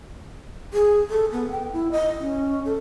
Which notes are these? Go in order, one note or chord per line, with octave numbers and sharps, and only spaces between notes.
G#4
A4
B3
G5
E4
D#5
C#4
A4